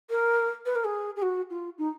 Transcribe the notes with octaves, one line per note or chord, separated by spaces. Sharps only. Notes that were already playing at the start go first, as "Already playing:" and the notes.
A#4
B4
A#4
G#4
G#4
F#4
F4
D#4